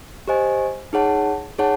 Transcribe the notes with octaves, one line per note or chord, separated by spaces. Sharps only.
G4 C5 D#5 G#5
D#4 G#4 C#5 F#5 A5
D#4 G#4 C#5 F#5 A5